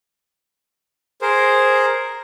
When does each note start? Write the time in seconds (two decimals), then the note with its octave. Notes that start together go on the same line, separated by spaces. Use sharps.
1.22 G#4 A#4 C5